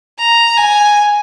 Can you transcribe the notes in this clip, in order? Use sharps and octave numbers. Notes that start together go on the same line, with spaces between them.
A#5
G#5